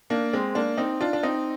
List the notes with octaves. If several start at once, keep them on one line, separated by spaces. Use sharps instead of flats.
A#3 D4
G#3 C4
A#3 D4
C4 D#4
D4 F4
D4
C4 D#4